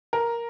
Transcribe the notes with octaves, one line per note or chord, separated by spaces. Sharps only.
A#4